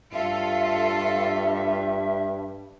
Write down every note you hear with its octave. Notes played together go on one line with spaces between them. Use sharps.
G2 F4 A4 E5